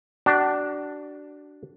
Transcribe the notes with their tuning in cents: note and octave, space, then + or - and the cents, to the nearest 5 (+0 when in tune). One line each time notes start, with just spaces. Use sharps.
D4 +0 F#4 +35